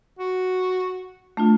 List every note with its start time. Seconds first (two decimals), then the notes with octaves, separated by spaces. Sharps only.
0.19 F#4
1.37 A3 D4 F4